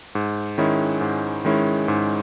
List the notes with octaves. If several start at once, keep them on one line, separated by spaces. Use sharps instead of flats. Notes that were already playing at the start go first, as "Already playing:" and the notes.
G#2
D#3 G#3 C#4 E4
G#2
D#3 G#3 C#4 E4
G#2